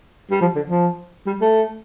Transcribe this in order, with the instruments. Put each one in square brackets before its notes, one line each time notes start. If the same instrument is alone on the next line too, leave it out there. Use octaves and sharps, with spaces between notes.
[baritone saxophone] G3
F3
D3
F3
G3
A3